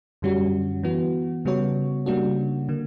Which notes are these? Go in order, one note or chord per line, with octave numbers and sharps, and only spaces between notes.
F#2 D3 G3 C#4 F#4
E3 B3 F#4
C#3 G3 B3 F#4 C#5
C#3 G3 A#3 D4 F#4
D3 A#3